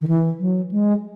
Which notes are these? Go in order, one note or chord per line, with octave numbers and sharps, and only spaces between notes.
D#3
E3
F#3
G#3